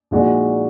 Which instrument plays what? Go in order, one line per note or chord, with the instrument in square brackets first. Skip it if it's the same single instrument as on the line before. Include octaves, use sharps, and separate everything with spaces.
[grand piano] A#1 A#2 G#3 D#4 F#4